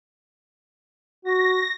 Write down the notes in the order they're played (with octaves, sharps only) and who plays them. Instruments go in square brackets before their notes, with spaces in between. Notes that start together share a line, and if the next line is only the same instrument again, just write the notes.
[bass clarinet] F#4 [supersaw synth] A#6